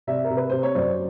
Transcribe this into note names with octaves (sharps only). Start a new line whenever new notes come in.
C3 D5 E5
A#4
C3
B4
C3 C5
C#5
F#2 C5 D5